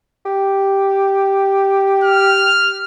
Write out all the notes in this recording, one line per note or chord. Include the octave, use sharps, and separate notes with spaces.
G4
F6